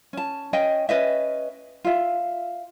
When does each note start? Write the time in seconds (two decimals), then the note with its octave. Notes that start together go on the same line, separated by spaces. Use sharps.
0.13 C#4 A5
0.53 C#4 D#5 G5 G#5
0.89 C#4 B4 D#5 E5
1.85 F4 E5